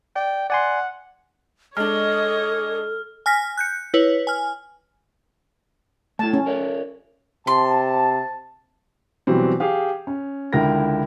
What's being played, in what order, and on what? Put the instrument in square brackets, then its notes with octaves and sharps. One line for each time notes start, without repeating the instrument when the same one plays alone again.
[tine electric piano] D5 [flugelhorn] G5
[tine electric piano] D5 G#5 C6 [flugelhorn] F#5
[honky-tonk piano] G#3 D4 [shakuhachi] A4 [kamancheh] C#5 D#5 [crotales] F6
[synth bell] G#5 F6 A#6 B6
F#6 G6 C#7
E4 B4 C#5
G#5 F6
[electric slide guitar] A3 E4 [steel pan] A5
[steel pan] C#4
[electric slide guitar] A#4 C#5 D5
[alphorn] C3 [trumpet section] A5 [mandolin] C6
[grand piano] B2 E3 F#3 G3 C4
G4 G#4 F5
C#4
C#2 D3 E4 A#4 G5 A#6